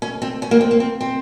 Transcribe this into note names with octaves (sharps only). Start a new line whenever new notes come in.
C#4
C4
C#4
A#3
C4
A#3
C4
C4